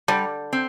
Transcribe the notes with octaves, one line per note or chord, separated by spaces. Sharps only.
D3 G3
C4